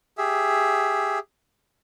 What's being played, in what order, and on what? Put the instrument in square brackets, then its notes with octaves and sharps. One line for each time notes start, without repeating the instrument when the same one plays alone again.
[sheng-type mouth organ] G4 G#4 E5